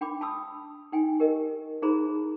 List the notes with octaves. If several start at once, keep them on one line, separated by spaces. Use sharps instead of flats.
D4 G5 B5 D6
A5 B5 D#6 E6
D#4 G5 G#5
G4 A#4 D#5
D#4 E4 G#4 C5 A#5 B5